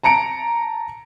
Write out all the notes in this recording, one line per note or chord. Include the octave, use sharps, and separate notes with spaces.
A5 A#5 C#7 D7